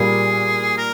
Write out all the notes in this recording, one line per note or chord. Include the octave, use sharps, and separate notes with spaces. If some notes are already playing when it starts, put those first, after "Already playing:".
Already playing: A#2 G3 A#3 G#4
A#4